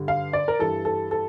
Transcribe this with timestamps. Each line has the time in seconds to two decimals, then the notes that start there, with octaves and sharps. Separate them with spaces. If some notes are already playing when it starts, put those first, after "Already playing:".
Already playing: G2 D3
0.08 F5
0.33 D5
0.48 A#4
0.59 G2 E3 A4
0.85 A4
1.11 A4